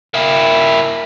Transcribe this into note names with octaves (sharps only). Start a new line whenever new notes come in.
A#3 E4